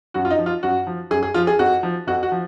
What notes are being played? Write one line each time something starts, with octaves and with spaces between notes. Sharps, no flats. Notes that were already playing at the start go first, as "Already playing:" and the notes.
F#2 F#4
F4
D#4
F3
F4
F#2 F#4
F3
F#2 G#4
G#4
F3 F4
G#4
F2 F#4
F3
F2 F#4
F#4
F3